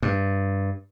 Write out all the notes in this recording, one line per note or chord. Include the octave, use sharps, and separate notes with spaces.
G2